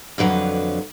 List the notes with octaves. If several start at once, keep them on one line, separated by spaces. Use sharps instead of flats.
F2 D3 F#3 B4